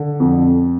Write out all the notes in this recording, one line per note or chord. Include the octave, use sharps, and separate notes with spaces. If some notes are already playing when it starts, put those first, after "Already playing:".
Already playing: D3
F2